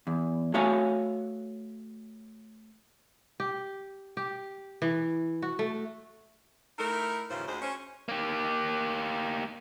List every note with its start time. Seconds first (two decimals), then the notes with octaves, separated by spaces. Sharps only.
0.07 E2
0.54 A3 F#4 C#5 E5 F5 G#5
3.40 G4
4.17 G4
4.82 E3
5.42 F#4
5.59 A3
6.78 A3 D#4 E4 A#4
7.30 D#2 G#2 C#3 E3 F4 C5
7.47 D2 G#3 C5
7.62 C#4 C5
8.08 A#3 G4